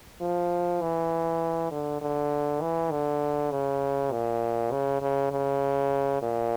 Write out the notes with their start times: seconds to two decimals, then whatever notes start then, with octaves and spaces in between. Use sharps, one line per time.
0.21 F3
0.82 E3
1.72 D3
2.02 D3
2.61 E3
2.91 D3
3.51 C#3
4.12 A#2
4.71 C#3
5.02 C#3
5.32 C#3
6.22 A#2